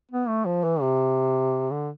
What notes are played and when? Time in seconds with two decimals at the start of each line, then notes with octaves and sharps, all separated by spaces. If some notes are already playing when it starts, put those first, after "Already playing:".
0.11 B3
0.28 A3
0.45 F3
0.64 E3
0.81 C3
1.71 D3